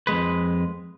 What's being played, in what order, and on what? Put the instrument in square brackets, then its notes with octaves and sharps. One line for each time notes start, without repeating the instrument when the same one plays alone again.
[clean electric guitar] F2 G#2 G#3 B4